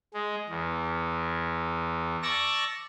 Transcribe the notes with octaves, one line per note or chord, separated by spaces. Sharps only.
G#3
E2
D5 A5 C#6 E6 A#6